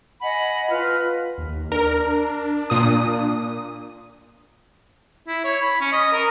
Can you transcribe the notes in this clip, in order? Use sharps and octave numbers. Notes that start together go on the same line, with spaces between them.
D#5 F#5 G#5 B5
F4 B4 F6
D#2
D4 A#4
A#2 D#6
E4
C#5
B5
C#4
D#5
A#4